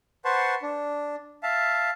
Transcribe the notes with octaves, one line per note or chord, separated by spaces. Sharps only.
B4 C5 F#5 A5 C6 C#6
D4
E5 F5 A5